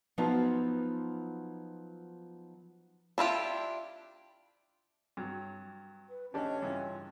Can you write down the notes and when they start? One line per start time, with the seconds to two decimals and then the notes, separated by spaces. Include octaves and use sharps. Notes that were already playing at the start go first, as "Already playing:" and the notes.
0.18 F3 F#3 B3 D#4 F4
3.18 D4 E4 F4 G4
5.17 G2 F#3
6.08 B4
6.34 A1 C#4 D4 G4 D#5 A5
6.62 G2 C#3 E3 F4